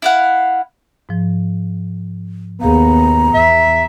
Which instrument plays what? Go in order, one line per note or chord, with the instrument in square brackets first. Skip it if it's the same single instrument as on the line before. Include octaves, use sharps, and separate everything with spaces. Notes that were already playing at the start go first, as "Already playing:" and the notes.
[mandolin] E4 F5 F#5
[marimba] G#2 F3
[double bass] D#2 B3 [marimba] G#4 F5 [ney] A#5
[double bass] E2 [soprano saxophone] E5